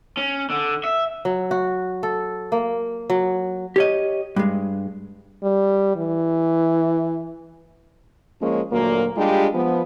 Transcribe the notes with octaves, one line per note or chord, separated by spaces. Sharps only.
C#4
D3
E5
F#3
F#4
A4
A#3
F#3
G4 C#5 D#5
G2 G#3
G3
E3
F3 G#3 A#3 C#4
D2 A#2 F#3 A#3
G3 G#3 D4 F4 G4
F3 B3